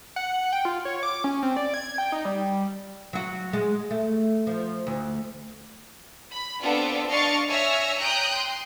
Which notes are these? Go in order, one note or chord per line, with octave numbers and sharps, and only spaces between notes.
F#5
G5
F4
C#5
D6
C#4
C4
D5
G#6
G5
D#4
G3
F#3 F#4
G#3
A3
F3
D2
B5
B3 C4 D4 F4 A4 B4
D4 D#5 F5 C#6 A6 C7
C#5 E5 G#5 E6 F6 A#6
G5 A#5 D#6 F#6 G6
C6